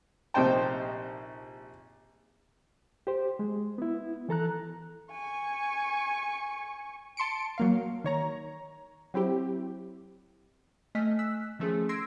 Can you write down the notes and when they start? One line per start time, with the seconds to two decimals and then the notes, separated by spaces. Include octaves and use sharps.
0.34 A#1 C3 D#4 C5 G5 A5
3.07 G4 C5
3.39 G#3
3.78 B3 E4
4.29 E3 A4 A#5 F#6
5.11 G#5 C#6
7.17 A5 C6 C#7 D7
7.58 F#3 A#3 F5
8.04 D#3 C#5 A#5
9.14 F#3 C4 E4 G4
10.95 A3 D#5 G#5 F6 B6
11.19 E6 F#6 B6
11.59 D#3 F3 A3 C#4 G#4
11.89 C6 E6 G#6 A#6 C7 D7